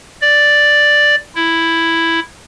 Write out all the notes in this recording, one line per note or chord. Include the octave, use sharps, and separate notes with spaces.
D5
E4